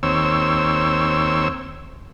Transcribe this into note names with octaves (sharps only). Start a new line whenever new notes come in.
D#2 C4 C#5 E6